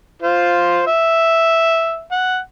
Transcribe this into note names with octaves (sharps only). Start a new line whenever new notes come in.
F4 C5
E5
F#5